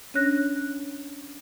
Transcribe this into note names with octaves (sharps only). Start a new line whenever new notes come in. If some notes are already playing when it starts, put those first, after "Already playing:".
C#4 D4 C#5 F#6 A#6